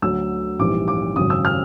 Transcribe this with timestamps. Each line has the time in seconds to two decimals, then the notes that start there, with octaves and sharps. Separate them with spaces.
0.02 D2 D3 F#3 E6
0.59 A#1 G#2 E3 G3 D6
0.88 D6
1.16 G#1 F#2 C#3 F#3 D#6
1.30 E6
1.45 F6